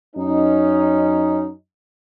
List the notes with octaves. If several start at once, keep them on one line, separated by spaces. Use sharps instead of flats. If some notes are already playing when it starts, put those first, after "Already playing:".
F#2 C#4 D#4